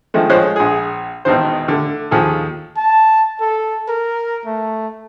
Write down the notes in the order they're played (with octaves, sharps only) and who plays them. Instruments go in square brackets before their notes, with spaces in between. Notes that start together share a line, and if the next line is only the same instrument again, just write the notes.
[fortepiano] D#3 F3 G#3 A3
F3 G#3 C5 C#5 F#6
A#1 G#4
G#1 E2 B2 D#3 C5
D3 A3
D#2 F3 G#4 A4
[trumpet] A5
A4
A#4
A3